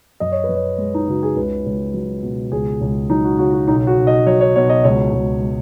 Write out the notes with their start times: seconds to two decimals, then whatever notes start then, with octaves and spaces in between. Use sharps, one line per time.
0.20 F#2 D#5
0.32 C#5
0.44 B4
0.49 F#2
0.55 C#5
0.78 G#3
0.94 D#4
1.08 C#3 F#4
1.23 G#4
1.36 C#2 B4
1.66 C#2
1.94 F#3
2.23 B2
2.52 C#2 G#4
2.81 C#2
3.10 F#3 D#4
3.24 F#4
3.39 C#3 F#4
3.53 F#4
3.68 B1 D#4
3.87 F#4
3.98 B1
4.07 D#5
4.26 F#3 C#5
4.41 C#5
4.56 B2 C#5
4.69 D#5
4.84 C#2 C#5
5.13 C#2
5.42 G#3